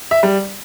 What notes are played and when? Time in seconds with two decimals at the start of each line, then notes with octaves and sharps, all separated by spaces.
0.11 E5
0.23 G3